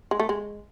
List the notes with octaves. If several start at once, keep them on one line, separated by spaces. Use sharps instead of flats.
G#3
A3
G#3